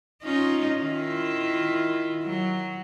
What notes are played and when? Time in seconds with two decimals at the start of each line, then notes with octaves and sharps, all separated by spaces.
0.23 C#4 D#4 F4
0.82 D#3 E4 F4
2.24 F#3